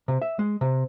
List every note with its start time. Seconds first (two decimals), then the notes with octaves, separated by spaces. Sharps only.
0.08 C3
0.22 E5
0.39 G#3
0.61 C3